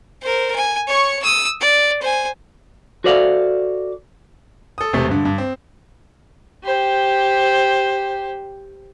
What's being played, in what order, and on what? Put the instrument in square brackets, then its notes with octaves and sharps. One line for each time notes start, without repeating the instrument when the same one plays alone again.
[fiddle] A#4 C5
G#5
C#5 C#6
D#6 E6
D5
C5 G#5
[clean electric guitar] F#4 A4 C5 D5 E5 F5
[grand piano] A4 D#6
E1 C3 A3
G2 D3
G2
C4
[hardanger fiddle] G4 C5